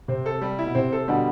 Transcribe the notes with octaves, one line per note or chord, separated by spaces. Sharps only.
C3 C4
A4
G3
E4
B2
C3 C4
A4
B2 D3 G3